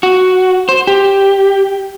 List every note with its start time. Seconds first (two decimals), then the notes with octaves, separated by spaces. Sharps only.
0.03 F#4
0.69 C5
0.87 G4